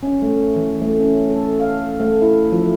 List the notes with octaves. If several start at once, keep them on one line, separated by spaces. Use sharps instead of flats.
C#4
A3
E3
A3
C#4
A4
F5
A3
E4
F3